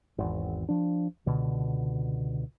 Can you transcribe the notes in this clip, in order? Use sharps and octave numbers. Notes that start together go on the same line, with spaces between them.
G#1 E2
F3 D4
C#2 B2 D3